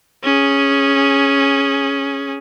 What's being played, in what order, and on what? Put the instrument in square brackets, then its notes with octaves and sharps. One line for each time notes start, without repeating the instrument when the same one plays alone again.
[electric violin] C#4 G#4